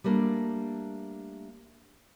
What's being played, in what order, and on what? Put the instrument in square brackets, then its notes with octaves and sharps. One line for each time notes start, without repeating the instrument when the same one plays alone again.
[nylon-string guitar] G3 A3 A#3 D4